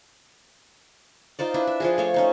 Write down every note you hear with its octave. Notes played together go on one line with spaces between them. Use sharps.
D#4 F4 C5 D5
D4 E4 B4
E5
F3 F4 G#4
A3 F4 C#5
C#4 D#4 C5